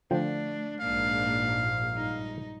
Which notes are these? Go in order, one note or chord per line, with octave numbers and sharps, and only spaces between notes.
D3 F3 A3 D4 G5
A#1 G#2 A#3 D4 F5
G2 D#4